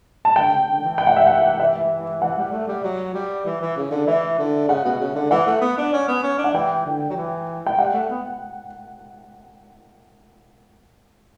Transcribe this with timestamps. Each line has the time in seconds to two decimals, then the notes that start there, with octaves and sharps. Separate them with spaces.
0.25 A5
0.36 D3 G5
0.52 C#3
0.68 D3
0.83 E3
0.98 G5
1.07 F#5
1.16 E5
1.27 F#5
1.60 E5
2.22 E3 F#5
2.38 G3
2.52 A3
2.68 G3
2.84 F#3
3.14 G3
3.46 E3
3.61 E3
3.77 C#3
3.91 D3
4.07 E3 E5
4.39 D3
4.68 C#3 F#5
4.85 B2
5.00 C#3
5.15 D3
5.31 E3 F#5
5.47 A3
5.61 B3
5.78 D4
5.93 C#4
6.08 B3
6.23 C#4
6.38 D4
6.44 F#5
6.54 E3 G5
6.86 D3
7.10 F#3
7.16 E3
7.67 G5
7.78 G3 F#5
7.93 A3
8.10 B3